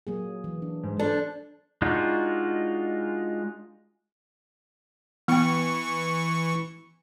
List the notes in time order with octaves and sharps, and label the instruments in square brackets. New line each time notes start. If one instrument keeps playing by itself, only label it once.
[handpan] F#3 A#3 G#4
E3
D4
[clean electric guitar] G#2
[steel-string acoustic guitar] D4 [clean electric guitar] A4 [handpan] C5
[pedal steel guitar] G#3 D4 D#4 F4 F#4
[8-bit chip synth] E3 C#6 [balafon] B3 G5